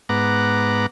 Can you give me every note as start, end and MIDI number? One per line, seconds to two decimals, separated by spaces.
0.09 0.86 44
0.09 0.86 59
0.09 0.86 78
0.09 0.86 82
0.09 0.86 86